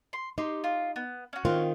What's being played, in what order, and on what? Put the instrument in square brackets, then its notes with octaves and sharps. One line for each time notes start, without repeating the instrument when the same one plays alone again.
[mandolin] C6
[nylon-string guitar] D#4 [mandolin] G4 C6
[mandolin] F4
B3
C#4 F#4
[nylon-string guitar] D#3 C4 F4